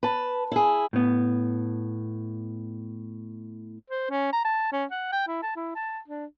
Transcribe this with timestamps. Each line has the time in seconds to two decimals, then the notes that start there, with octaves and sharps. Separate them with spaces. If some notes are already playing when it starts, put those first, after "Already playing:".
0.03 B4 A5
0.52 E4 G#4
0.93 A2 B3
3.90 C5
4.10 C#4
4.33 A#5
4.45 A5
4.73 C#4
4.91 F#5
5.12 G5
5.28 E4
5.43 A5
5.56 E4
5.76 A5
6.08 D4